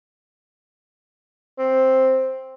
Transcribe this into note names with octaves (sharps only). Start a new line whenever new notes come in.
C4